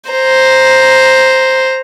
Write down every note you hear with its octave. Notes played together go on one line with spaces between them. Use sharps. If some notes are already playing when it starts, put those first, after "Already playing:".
C5 A#5